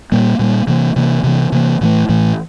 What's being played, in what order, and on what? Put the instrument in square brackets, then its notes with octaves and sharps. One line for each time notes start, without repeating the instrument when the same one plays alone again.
[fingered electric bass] A#2 G3 A#3
A#2 G3 A#3
C3 E3 A#3
C3 E3 A#3
C3 E3 A#3
C3 E3 A#3
A2 E3 A3
A2 E3 A3